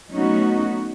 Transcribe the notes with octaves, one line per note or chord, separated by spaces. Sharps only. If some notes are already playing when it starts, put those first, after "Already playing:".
F#3 A3 B3 C#4 D#4 F#4